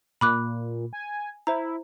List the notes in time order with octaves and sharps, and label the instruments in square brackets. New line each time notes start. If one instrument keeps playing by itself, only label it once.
[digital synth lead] A#2 [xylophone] B5 D6 F#6
[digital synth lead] G#5
[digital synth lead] E4 [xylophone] C5 A#5